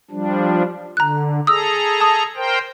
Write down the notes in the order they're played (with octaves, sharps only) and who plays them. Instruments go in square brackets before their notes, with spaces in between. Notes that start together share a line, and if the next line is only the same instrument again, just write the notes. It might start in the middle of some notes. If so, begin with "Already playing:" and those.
[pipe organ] F3 G3 D4
[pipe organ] D3 [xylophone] A#5 F#6
[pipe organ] G#4 A4 A#5 [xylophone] D#6 E6
[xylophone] A5 D#6
[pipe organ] A#4 C5 G5